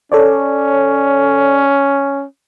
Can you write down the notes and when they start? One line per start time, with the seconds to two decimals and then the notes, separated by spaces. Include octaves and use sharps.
0.12 C#4 A4 C#5 D5